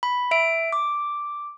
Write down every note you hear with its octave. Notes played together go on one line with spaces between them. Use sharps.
B5
E5 D7
D6